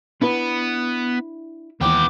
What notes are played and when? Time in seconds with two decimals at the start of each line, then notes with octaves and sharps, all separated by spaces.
0.22 B3 D4 E4 B4
1.81 D#2 E3 B3 G5 D6